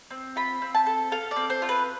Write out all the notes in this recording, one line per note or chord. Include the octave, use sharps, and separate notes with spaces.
C4
F4 B5
C4
A5
A4
A4 F5
D5
C4
C5
F4
B4